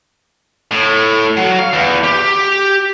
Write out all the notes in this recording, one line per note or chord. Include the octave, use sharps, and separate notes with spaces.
A2
F#3
F5
E2
G4